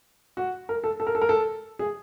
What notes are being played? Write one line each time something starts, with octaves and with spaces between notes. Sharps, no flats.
F#4
A#4
A4
A4
A#4
A4
A#4
A4
G#4